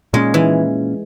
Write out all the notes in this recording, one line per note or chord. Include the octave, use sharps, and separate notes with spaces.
A#2 G#3 A#3 C#4
E3